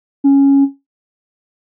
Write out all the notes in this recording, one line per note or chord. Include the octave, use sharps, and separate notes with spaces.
C#4